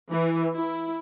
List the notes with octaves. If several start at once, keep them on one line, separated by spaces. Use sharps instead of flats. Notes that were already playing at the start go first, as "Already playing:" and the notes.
E3
E4